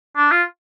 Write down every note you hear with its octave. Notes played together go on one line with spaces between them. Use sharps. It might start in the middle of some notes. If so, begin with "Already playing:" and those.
D4
F4